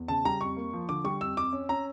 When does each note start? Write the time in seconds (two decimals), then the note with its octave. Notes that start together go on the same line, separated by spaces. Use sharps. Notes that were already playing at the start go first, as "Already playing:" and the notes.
Already playing: E2
0.08 C#3 A5
0.25 G3 A#5
0.41 F2 C#6
0.56 A#3
0.73 F3
0.89 D3 D6
1.04 G3 C#6
1.21 F2 E6
1.37 F2 D6
1.53 C#4
1.69 C#4 A#5